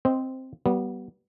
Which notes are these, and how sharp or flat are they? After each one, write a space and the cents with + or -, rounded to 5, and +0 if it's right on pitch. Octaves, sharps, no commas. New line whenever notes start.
C4 +0 C5 -10 D#5 +5
G3 -35 B3 -15